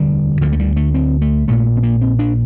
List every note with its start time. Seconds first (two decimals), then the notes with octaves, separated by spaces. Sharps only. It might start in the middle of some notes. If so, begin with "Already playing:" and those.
Already playing: E1 D2 D3 G3
0.41 D2 D3 F3
0.52 A3
0.60 G3
0.76 A3
0.94 C4
1.21 A3
1.48 A#1 A#2 A3
1.77 C4
1.83 A#3
2.02 C4
2.19 D4